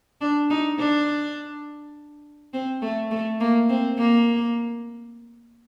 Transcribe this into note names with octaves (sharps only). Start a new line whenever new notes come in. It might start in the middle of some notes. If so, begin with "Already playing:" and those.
D4
D#4
D4
C4
A3
A3
A#3
C4
A#3